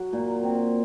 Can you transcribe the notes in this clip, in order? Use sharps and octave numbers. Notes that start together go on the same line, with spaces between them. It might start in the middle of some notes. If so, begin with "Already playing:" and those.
Already playing: F#3
A#2
C4